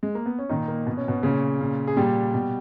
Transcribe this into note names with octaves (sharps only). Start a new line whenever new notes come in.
G#3
A#3
B3
C#4
A#2 D#3 D#4
A#3
B2 B3
C#4
B2 B3
A#2 C#3 C#4
A#2
G#4
A#2 G3 G4
B2